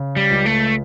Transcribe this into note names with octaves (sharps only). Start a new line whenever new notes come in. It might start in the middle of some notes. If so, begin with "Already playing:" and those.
Already playing: C#3
G3
C#2
A3